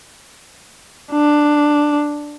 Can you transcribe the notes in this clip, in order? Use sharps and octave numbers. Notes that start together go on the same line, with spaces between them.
D4